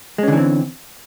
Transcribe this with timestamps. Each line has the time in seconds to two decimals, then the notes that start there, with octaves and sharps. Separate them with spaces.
0.18 G#3
0.23 C#4
0.28 D3
0.33 E3
0.37 C4